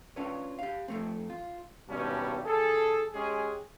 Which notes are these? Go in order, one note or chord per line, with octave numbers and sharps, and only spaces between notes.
C#4 D4 F4 B4 C#5
G4 F5
F2 A3 C4
F4
G#1 G2 B2 G3 C#4
D#2 G#4 A4
G#3 C#4 G4 G#4